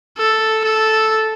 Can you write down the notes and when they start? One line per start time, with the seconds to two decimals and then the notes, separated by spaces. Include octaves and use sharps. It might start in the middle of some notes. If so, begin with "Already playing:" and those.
0.17 A4
0.64 A4